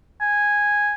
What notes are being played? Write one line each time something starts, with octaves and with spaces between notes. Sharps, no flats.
G#5